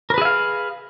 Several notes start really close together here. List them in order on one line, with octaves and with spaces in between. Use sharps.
A#4 B4 G#4 E5 F5